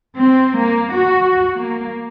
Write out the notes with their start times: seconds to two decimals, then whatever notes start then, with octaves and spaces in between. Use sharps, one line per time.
0.18 C4
0.58 A#3
0.95 F#4
1.58 A#3